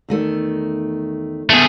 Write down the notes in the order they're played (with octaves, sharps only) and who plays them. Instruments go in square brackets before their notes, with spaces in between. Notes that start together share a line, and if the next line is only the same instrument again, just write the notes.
[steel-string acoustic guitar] E2 D#3 A3
[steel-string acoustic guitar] D3 B3 [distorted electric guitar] A3 G#4